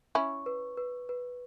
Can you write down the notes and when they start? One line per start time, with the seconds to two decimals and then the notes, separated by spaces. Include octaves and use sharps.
0.15 C#4 E4 C#6
0.46 B4
0.77 B4
1.09 B4